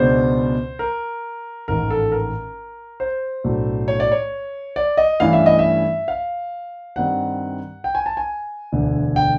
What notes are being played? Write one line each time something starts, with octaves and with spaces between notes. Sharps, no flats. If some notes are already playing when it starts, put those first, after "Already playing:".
Already playing: C#2 B2 G#3 B3 D4 C5
A#4
A1 G#2 D#3 A#4
A4
A#4
C5
B1 A2 F#3 A3 D4
C#5
D5
C#5
D5
D#5
G2 E3 A3 C#4 E4 F5
E5
D#5
E5
F5
G2 D#3 G3 C4 F#5
G5
G#5
A5
G#5
E1 D2 D3
G5